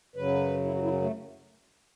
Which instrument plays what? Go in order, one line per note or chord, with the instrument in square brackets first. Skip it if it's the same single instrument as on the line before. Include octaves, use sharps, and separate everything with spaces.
[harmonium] F#2 C#3 F#3 B4
E4
F#4
E4
C#4
A3